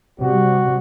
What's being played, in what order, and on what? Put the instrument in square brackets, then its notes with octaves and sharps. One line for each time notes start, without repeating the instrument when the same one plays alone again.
[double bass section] C3 G3 [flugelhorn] F#4